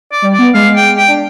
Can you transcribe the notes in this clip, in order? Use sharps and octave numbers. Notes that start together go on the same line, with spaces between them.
D5
G3
D5
B3
G#3 F5
G5
G5
D4